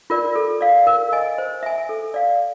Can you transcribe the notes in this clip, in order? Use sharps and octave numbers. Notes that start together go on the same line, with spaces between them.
F4 A#4 D5
A4
D5 F5
A#4
D#5 G#5
C5
E5 G#5
A4
D5 F5